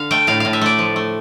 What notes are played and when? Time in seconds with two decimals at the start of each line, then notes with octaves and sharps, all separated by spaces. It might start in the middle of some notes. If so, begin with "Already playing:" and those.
Already playing: D3 F5
0.11 A3 G5
0.27 A2 F5
0.40 A2 F5
0.53 E5
0.61 A3 D5
0.79 F3
0.96 A3